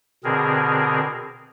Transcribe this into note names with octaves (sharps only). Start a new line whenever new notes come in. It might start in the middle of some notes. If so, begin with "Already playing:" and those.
B2 D3 C4 G#4 A#4